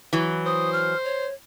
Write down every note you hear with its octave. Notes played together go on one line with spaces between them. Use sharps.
E3 F#3
C5 D#6
F6
C#5